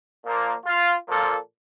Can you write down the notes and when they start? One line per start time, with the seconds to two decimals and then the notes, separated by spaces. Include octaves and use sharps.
0.25 A#2 F3 A#3
0.65 F4
1.08 A#2 F3 A#3 A4